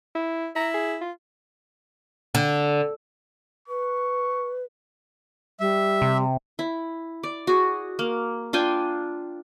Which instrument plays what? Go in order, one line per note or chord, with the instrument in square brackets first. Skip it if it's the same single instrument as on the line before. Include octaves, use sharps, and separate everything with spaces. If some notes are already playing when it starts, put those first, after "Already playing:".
[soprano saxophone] E4
[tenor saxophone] E4 [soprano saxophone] A#5
[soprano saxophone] G#4
F4
[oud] D3
[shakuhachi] B4 [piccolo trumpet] C#6
[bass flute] G3 [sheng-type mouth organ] E5
[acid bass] C3
[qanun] E4
D5
F#4 G#4
A#3
D4 F4 G5 G#5